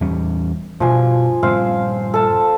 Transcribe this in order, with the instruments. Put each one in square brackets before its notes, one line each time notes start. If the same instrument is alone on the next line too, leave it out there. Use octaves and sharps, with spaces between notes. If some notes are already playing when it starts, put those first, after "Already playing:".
[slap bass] E2 G3 C#4
[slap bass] G2 B2 [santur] F3 G#5
[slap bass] G2 A#2 C#3 [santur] C4 F5
[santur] A4 A5